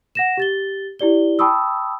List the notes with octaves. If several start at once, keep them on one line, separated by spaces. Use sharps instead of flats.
F#5 A#6 E7
G4 A6 G7
E4 G4 D5 G7
G5 A5 B5 C#6 D#6 E6